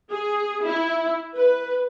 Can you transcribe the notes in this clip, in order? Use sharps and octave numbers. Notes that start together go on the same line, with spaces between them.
G#4
E4
B4